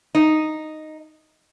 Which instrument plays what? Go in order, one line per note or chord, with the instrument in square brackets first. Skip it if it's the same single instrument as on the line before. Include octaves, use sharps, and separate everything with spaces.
[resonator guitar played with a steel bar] D#4